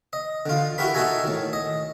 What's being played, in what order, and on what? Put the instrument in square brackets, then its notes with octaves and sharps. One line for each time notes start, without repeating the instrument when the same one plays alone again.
[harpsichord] D#5
D3 F4
E4 F#4 G4 A#4 B5
D#4 F#4 A4 E5 G#5 A#5
A2 D#3
D#5